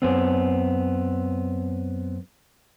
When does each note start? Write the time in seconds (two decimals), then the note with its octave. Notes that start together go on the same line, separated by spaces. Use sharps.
0.02 F#2 B3 C4